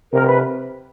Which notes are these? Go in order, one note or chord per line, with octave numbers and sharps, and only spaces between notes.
C3 A#4
B4